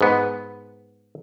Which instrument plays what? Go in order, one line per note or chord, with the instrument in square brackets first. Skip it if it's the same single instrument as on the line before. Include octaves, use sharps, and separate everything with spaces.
[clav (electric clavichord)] G#2 B3